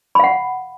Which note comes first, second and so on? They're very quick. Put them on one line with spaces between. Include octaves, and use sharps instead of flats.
B5 F5 F#5